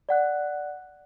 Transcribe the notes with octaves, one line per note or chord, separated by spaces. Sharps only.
D5 F#5 F#6